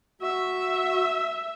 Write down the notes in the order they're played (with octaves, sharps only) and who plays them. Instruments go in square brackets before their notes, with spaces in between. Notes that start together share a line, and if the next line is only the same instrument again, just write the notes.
[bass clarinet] F#4 [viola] E5